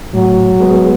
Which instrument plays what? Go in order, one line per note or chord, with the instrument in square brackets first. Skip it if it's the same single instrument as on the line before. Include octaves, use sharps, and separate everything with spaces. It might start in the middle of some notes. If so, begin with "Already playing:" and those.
[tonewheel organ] A2 [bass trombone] F#3
[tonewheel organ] G#3 B3